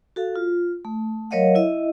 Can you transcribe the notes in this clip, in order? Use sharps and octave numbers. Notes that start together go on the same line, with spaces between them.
F#4 A4 F5
F4
A3
F#3 A#4 C#5 D#5 F5 F#5
E4 D#5 E5